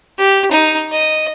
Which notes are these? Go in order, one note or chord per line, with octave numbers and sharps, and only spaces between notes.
G4
D#4
D#5